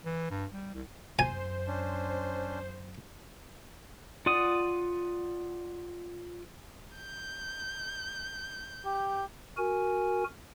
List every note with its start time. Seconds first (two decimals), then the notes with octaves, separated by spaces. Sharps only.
0.05 E3
0.31 G2
0.53 G3
0.74 C2
1.19 F#2 C5 G#5
1.67 C#4 D4
4.26 F4 D5 F#5 D#6
6.95 G6
8.86 G4
9.57 F#4 A#4 G#5